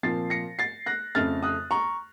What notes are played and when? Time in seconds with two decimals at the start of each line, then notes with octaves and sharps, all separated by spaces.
0.03 A#2 F3 C4 A6 C7
0.30 A#6 C#7
0.59 A6 C7
0.86 F#6 A#6
1.15 F2 C#3 A3 F6 A6
1.43 D#6 F#6
1.71 A#5 C#6